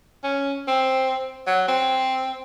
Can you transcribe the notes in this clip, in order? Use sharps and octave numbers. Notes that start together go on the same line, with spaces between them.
C#4
C4
F#3
C4